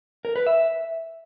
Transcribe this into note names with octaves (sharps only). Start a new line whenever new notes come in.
A#4
B4
E5